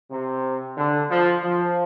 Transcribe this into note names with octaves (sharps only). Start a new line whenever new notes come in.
C3
D3
F3
F3